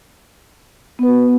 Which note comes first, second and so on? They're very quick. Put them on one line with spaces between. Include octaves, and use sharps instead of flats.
B3 B4 F#4